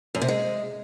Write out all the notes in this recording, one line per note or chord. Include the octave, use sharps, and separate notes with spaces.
F#2
C3
G#3